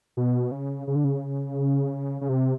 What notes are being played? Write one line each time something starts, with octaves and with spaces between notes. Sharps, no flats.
B2
C#3
C#3
D3
C#3
C#3
C3